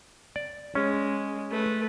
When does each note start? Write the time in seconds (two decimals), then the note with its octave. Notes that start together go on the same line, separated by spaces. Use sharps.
0.36 D5
0.75 G#3 C#4
1.51 A3 B4